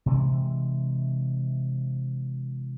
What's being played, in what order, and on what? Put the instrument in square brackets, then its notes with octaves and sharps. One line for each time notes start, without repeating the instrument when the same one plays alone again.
[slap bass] C3 E3 G#3